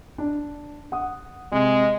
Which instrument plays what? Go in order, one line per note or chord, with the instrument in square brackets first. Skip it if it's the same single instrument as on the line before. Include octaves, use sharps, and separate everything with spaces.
[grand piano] D4
F#5 D#6
[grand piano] C3 [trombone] G#3